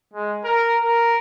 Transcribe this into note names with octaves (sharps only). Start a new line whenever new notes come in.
G#3
A#4
A#4